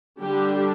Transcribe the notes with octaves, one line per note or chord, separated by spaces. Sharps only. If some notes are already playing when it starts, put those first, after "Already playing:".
D3 G3 D4 G4